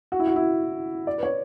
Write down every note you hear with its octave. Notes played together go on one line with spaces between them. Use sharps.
F#4
E4
F#4
E4
D5
B4
C#5